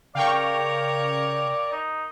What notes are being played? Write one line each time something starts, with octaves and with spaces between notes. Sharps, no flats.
C#3 A#4 C#5 D5 F5 G5 C#6
D#4